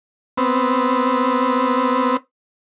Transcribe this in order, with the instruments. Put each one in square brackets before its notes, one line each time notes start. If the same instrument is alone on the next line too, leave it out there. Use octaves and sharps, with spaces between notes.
[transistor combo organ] B3 C4